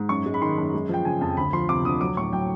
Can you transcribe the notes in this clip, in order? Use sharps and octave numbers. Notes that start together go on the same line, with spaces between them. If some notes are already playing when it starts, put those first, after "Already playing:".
Already playing: G#2
F#2 C#6
G#3
B5
D#3 C6
F#2
G#3
F3 G5
C#3 G#5
F2 A5
D2 B5
F3 C6
C3 D6
D2 D#6
F#3 D6
A2 C#6
F#3 G5